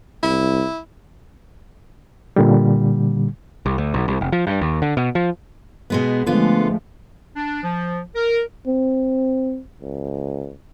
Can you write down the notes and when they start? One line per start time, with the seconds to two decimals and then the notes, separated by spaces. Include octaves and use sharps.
0.23 C2 E4
2.36 A#2 D3 G3
3.66 C2
3.78 D2
3.94 B1
4.08 C2
4.21 F1
4.32 F3
4.47 G2
4.61 D#2
4.82 D3
4.97 B2
5.15 F3
5.90 B2 G#3 B3
6.26 D3 F3 G#3 A3 B3 F4
7.35 D4
7.63 F3
8.15 A#4
8.67 C4
9.81 C#2